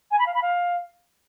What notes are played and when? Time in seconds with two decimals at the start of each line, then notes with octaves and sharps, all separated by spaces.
0.11 G#5
0.19 B5
0.27 F5
0.34 B5
0.42 F5